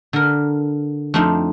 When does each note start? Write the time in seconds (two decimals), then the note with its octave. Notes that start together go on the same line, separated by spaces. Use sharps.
0.13 D3 A#4
1.14 F2 A3 C4 D4 D#4